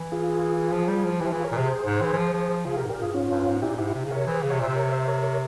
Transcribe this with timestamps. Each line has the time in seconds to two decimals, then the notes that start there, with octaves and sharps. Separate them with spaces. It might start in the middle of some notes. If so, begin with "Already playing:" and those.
Already playing: E3
0.12 F4 G#4
0.71 F3
0.88 G3
1.04 F3
1.20 E3 E4 G4
1.27 F3
1.32 E3 F4 G#4
1.44 A#4 C#5
1.52 A#2
1.57 C3 G#4 C5
1.85 G#2
2.01 E3
2.13 E3
2.17 F3
2.33 F3
2.49 F3
2.65 C#3 F4 G#4
2.77 C3 G4 A#4
2.84 G#2
2.89 A#2 G4 A#4
3.01 G2 F4 G#4
3.13 G#2 C#4 F4
3.30 G2
3.46 G#2
3.62 A#2 E4 G4
3.78 G#2 E4 G4
3.94 C3
4.04 C#3
4.10 C3 A#4 C#5
4.26 E3 G#4 C5
4.43 C#3
4.50 C3 C#5
4.59 A#2 C5 E5
4.68 C3
4.75 A#4 C#5
4.91 C5 E5
5.08 A#4 C#5
5.23 A#4 C#5